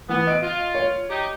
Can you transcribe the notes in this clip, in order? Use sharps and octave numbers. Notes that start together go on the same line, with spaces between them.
E3 B3
D#5 D7
F4
C#5
D#4 G4